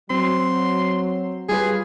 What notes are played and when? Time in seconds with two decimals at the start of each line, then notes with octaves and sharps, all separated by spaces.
0.10 F#3 C4 C6
1.49 G3 F4 G#4 B4